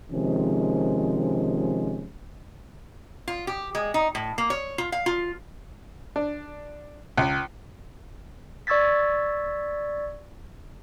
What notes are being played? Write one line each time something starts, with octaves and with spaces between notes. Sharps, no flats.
C3 D#3 F3 G#3 C#4
F4
G4
G#3
D#4
A2
A#3
C#5
F4
F5
F4
D4
C#2
D5 C#6 E6 G#6 A6 B6